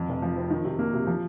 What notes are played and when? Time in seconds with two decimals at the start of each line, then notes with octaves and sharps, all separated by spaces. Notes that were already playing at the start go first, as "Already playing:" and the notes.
Already playing: F2
0.09 F1
0.22 F3
0.37 C4
0.50 D#3
0.65 C3
0.79 A#3
0.93 C3
1.07 F3